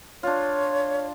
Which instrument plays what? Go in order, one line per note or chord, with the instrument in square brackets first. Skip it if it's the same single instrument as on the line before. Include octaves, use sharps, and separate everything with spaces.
[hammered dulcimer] D4 F4 [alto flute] C#5